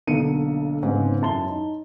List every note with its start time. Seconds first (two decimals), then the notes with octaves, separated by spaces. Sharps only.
0.07 B1 D3 A#3 A4 C#7 D#7
0.83 G#2 C#3 G#3 B3 C4
1.22 F#2 E4 A5 C6 G7
1.48 D#4